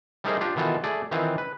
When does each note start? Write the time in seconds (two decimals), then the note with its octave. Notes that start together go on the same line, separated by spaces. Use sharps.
0.24 G3 A3 D#4 G#4 A#4 C5
0.41 D4 F4 G4
0.56 B2 D#3 E3 F4 A4
0.84 A3 G#4 D5
1.11 D#3 E3 C4 F4 F5
1.38 B4